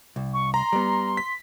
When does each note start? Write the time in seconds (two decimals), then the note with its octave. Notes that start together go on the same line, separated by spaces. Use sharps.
0.16 C2
0.34 C#6
0.54 A#5 C6
0.73 G3 B3
1.17 B6